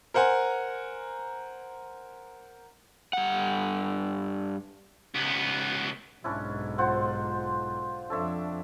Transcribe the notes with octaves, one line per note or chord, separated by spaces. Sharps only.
A#4 C5 F#5 G#5 A#5
G2 F#5
C#2 B3
B1 G#2 C#4 D4 E4
F4 C5 F#5
F2 D4 A4 C#5 E5